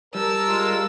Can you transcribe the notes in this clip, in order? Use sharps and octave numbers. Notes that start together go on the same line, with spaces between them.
G3 A#4 A5 E6
G#3 F4